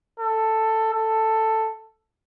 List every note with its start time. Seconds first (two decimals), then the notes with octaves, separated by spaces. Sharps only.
0.20 A4
0.93 A4